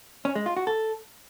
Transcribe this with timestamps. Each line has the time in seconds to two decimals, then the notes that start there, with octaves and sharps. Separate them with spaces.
0.25 C#4
0.35 G#3
0.46 F4
0.56 F#4
0.67 A4